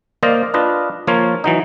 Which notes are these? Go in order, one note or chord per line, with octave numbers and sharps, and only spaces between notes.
A#3 A#4 C5 D5 D#5
D4 F4 B4 D#5
F3 A#3 F4 C#5
E3 F#3 D#4